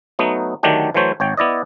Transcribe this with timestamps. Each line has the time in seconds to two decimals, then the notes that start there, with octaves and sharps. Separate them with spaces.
0.19 F#3 A3 B3 D#4
0.63 D3 D#3 F#3 A3 D4 G4
0.94 E3 F#3 A3 C5 C#5
1.20 G#1 C#5 G5
1.37 B3 E4 D5 D#5